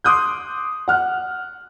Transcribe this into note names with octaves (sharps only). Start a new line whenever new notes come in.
C6 D6 D#6 F#6 G6
F#5 F6 F#6